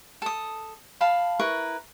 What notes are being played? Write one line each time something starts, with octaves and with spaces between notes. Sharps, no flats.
A4 D#6
F5 A5 B5
E4 A#4 B4 C#6